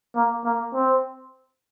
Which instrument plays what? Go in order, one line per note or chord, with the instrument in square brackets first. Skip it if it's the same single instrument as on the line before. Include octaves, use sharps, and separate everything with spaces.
[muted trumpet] A#3
A#3
C4